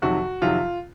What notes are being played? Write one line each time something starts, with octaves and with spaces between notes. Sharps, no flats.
F2 C3 D#3 F#3 F#4
F2 C3 D#3 F#3 F4